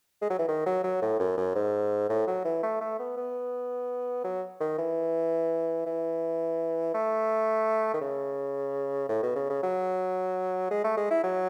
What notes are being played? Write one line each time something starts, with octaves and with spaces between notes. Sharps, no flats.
G#3
F#3
E3
D#3
F#3
F#3
A2
F#2
F#2
G#2
A2
F#3
E3
A3
A3
B3
B3
F#3
D#3
E3
E3
A3
D#3
C#3
A2
B2
C#3
C#3
F#3
G#3
A3
G#3
E4
F#3